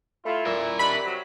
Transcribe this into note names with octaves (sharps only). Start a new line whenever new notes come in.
A3 E4 F4
A#2 A#4 E5
E4
D#3 E3 G3 D4 B5
C3 F#3